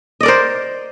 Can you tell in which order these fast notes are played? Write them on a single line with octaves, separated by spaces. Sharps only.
D#5 D5 A#4 C5